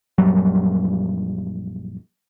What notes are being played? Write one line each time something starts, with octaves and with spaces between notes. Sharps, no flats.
A#1 F#2 F#3 G3